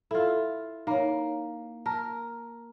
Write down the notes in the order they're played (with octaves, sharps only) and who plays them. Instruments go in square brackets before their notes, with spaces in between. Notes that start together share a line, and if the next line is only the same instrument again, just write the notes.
[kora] E4 F4 [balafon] A4
[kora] A#3 [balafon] D#4 C#5
[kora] A#4 [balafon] A5